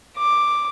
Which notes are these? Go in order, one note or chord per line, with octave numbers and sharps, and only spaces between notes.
D6